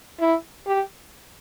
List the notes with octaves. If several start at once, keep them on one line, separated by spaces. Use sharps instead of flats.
E4
G4